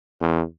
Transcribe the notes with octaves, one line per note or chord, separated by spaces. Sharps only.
E2